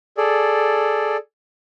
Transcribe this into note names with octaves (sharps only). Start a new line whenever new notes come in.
G#4 A4 D5